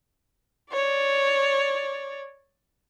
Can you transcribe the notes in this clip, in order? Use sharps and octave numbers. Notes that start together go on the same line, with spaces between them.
C#5 D5